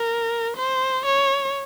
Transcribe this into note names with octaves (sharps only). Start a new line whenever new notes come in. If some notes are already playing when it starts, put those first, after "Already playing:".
Already playing: A#4
C5
C#5